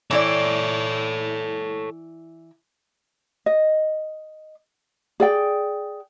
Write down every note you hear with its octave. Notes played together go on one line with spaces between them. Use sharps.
E3 E4 A4 C#5 D5
D#5
G#4 D5 G5